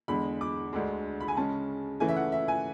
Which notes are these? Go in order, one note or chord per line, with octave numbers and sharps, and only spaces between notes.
E2 D3 G#3 B5
D6
D2 D3 G#3 D4
B5
G#5
C#3 G#3 C#4 A5
C#3 E3 A3 C#4 G#5
E5
F#5
E5
G#5